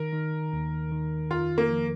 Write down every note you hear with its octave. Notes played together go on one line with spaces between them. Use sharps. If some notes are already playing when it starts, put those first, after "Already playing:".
Already playing: D#3 A#4
D#3
D#2
D#3
F2 F4
A#3
F3